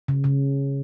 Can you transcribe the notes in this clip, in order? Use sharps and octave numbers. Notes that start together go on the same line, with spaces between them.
C#3
C#3